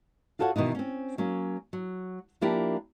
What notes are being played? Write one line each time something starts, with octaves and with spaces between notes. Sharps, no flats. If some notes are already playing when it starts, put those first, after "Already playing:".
F4 F#4 A4 C#5 F5 F#5
B2 D#3 E3 D#4
C4 C#4
F#3 A#3 C#4
F#3
F3 A#3 D4 E4 G4 A#4